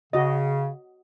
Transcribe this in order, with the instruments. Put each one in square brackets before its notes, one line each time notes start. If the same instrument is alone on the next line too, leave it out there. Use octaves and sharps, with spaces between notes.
[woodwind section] C#3 [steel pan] F#4 D#5